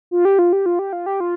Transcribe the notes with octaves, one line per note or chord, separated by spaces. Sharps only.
F4
G4
F4
G4
F4
G4
F4
G4
F4